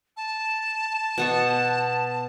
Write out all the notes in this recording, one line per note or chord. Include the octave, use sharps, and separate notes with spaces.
A5
B2 B3 C#6